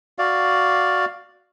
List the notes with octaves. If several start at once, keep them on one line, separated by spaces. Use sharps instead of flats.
F#4 D5 F5